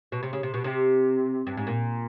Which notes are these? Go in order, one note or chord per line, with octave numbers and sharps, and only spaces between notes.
B2
C3
C#3
C3
B2
C3
G2
G#2
A#2